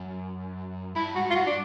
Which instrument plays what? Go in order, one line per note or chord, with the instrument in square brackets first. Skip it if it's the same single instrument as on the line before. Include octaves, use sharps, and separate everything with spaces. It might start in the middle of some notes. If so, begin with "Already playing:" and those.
Already playing: [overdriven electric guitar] F#2
[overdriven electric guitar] G2 [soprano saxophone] E4
[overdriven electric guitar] G#2 [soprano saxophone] F#4
[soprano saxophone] F4
[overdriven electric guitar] G2 [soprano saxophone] F#4
[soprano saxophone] D4